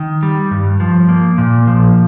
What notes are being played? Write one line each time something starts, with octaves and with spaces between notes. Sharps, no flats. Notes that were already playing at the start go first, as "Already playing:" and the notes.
Already playing: D#3
G3
G2
F3
A#3
A#2
F3